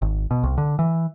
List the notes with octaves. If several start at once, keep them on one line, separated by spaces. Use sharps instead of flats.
G#1
B2
C2
D3
E3